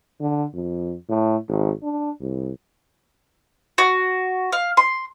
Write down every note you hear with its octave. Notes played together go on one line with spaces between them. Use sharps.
D3
F2
A2
G#1
D4
C2
F#4
F5
C6